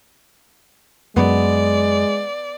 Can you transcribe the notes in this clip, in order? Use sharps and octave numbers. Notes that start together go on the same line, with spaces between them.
F#2 F#3 G#3 B3 D5